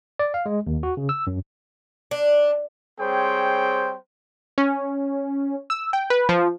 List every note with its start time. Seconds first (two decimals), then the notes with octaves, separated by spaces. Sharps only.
0.19 D5
0.34 F5
0.46 G#3
0.67 D#2
0.83 F#4
0.97 C#3
1.09 E6
1.27 F#2
2.11 D4
3.00 G3 C4 G#4 C5 C#5 G5
4.58 C#4
5.70 E6
5.93 G5
6.10 B4
6.29 F3